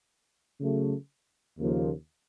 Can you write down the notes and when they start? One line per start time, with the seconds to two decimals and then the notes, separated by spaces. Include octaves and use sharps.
0.60 C#3 F#3 A3
1.57 D#2 C#3 F3 A#3